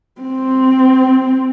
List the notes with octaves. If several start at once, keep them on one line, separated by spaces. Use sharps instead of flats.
C4